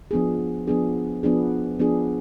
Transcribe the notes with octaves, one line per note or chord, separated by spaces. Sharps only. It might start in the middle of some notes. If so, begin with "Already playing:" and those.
F3 B3 D4 G#4
F3 B3 D4 G#4
F3 B3 D4 G#4
F3 B3 D4 G#4